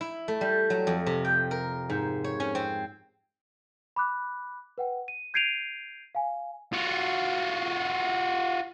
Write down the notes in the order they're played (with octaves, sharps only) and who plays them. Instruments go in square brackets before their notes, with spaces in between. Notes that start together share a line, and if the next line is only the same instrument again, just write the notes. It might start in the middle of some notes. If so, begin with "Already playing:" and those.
[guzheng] E4
A3
G3
F#3
F2
C3
G5
A#4
G#2
C#5
C#4
C4
[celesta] B5 D6 F#6
B4 F#5 G5
D#7
G6 G#6 C7 D7 D#7 F7
F5 G#5
[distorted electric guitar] F4 F#4